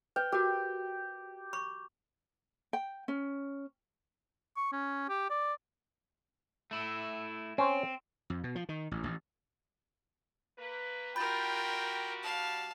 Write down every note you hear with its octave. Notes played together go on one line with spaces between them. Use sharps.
B4 G5
F#4 G4 A#4
B5 C#6
G5
C#4
C#6
C#4
G4
D5
A3 E4
C4 C#4 C5
F2
B2
F3
D#3
A1
A1
A#3 B4
G3 F4 F#4 A#4 G5 B5 G6 A6
F5 A5